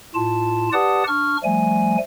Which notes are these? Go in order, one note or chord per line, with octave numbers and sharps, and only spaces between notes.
A2 F4 A5
G4 B4 D5 F#5 A5 D#6
D4 C#6 F6
F3 G3 A3 G#5